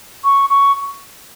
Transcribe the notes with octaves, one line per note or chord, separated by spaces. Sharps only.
C#6
C#6